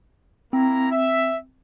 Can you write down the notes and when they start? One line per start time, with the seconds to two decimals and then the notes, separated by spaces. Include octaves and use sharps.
0.53 A#3 C4 E4 A#5
0.92 E5